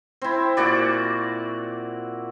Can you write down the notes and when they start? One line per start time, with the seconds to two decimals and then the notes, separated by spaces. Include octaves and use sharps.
0.22 C4 E4
0.57 A#2 F#4 D5